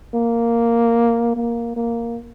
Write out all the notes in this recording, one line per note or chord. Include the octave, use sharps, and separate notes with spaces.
A#3
A#3
A#3